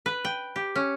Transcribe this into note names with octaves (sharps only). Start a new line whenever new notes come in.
B4
G5
G4
C#4